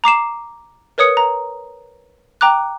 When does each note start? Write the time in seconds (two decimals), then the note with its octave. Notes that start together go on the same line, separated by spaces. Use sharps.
0.04 A#5 D6 C7 E7
0.98 A#4 B4 C#5 D#6 C#7
1.17 A#5
2.41 G5 A#5 D6 F#6